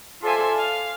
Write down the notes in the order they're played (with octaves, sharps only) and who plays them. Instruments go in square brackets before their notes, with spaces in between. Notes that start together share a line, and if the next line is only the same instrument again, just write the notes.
[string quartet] F4 A4 C5 D5 E5 G#5
F5